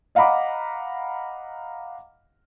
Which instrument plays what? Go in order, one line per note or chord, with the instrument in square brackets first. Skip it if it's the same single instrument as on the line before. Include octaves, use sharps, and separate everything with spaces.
[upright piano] D#5 F5 F#5 A#5 B5 D6